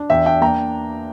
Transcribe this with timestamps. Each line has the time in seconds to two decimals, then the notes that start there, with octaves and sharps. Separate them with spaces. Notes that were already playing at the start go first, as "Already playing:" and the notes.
Already playing: D4
0.10 E2 E5 G5
0.26 D4 E5 G5
0.41 A#3 G5 A#5